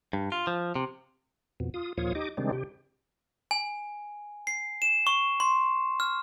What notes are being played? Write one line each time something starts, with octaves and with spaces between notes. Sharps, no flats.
G2
F4
F3
C3
F2 B2
F4 D#6
D#2 A#2 F3 F4 C#5 D#6
D#4 G4 D#5 D6
C3 D#3 G3 G#3 C4 D4
C3 G4
G#5
C7
E7
C#6
C6
F6